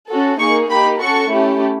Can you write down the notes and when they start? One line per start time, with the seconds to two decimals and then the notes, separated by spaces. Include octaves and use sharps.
0.08 C#4 F#4 A4
0.39 A#3 D#4 G#4 C#6
0.70 A#3 D#4 G4 B5
1.00 C#4 F#4 A4 C#6
1.31 A3 C#4 E4 G4